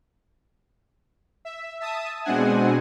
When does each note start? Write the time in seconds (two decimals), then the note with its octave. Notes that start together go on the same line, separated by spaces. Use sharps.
1.45 E5
1.80 E5 A5 D#6
2.25 B2 G#3 C4 D4 F#5 G#5